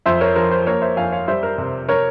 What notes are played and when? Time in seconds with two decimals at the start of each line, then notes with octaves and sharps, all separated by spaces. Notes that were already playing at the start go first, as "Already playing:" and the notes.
0.06 F2 C5 E5
0.21 A#4 C#5
0.36 F3 A#4
0.51 C5
0.67 A#3 A#4 C#5
0.81 C5 E5
0.97 F2 F5 G#5
1.12 C#5 F5
1.28 G3 C5 E5
1.43 A#4
1.58 C3
1.89 A#4 C#5